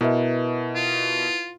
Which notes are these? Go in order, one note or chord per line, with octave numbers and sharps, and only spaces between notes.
B2 E4 A#4 B4 D#5 E5
F4